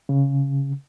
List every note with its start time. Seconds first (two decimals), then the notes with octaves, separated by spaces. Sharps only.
0.09 C#3